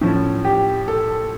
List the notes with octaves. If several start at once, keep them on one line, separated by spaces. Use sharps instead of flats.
A2 F3 C#4
G4
A4